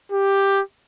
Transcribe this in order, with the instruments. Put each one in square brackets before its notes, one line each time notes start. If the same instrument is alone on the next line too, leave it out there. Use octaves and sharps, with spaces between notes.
[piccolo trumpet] G4